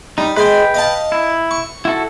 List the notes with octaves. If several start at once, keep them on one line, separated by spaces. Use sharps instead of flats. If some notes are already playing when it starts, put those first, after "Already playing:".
G3 D#4
G#3 B4 D#5 G5 G#5
D#5 F5 A5
E4
C#6
E4 F#4 A4